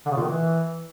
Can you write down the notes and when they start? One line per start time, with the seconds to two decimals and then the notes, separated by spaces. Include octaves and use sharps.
0.06 D3
0.11 C#3
0.16 A#2
0.21 D#3
0.27 E3